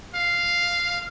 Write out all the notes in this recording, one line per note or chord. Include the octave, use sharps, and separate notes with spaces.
F5